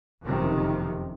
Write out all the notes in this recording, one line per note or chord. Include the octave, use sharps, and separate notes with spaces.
F#1 F2 C3 D#3